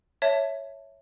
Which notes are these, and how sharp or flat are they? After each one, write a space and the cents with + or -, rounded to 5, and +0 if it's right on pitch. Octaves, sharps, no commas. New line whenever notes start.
C#5 +0 E5 +0 A5 +0